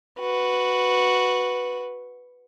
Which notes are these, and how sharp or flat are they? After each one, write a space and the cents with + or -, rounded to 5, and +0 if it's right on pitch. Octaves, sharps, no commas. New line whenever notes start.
F#4 -5 B4 +0